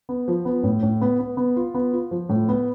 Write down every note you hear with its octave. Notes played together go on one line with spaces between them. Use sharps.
B3
F3
B3
A2
A2
B3
B3
B3
F4
B3
F4
F3
A2
B3